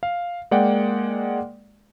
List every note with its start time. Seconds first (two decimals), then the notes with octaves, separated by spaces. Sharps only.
0.03 F5
0.51 G#3 A#3 D5 F#5 G5